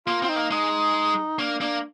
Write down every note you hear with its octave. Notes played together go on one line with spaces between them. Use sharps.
A#3 F4
C4 F4
D#4
A#3
G#3 D#4
A#3 D4
A#3 D4